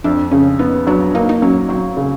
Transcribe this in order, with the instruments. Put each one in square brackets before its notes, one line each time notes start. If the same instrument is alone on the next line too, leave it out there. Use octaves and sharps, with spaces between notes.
[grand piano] F2 [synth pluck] D4
[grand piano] C#3 [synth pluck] C#4
[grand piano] B3 [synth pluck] D#4
[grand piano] F#3 [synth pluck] D4
[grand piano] A#3 [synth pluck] D#4
[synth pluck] D#4
[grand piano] F#3 [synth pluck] C#4
[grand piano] F#3 [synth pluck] C4
[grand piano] C#3